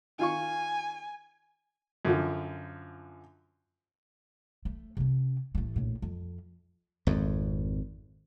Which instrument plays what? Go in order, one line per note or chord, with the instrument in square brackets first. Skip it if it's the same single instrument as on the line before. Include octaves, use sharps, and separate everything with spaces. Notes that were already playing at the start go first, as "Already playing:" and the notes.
[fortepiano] D#3 F4 C#6 [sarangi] G#5
[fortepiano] F#2 D3 F3
[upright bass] A3
C3 C#4
A1 A3
A#1 A2
F2
[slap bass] G#1 F2